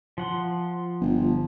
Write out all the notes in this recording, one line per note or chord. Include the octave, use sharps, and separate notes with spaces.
F3 F#5 C6
G1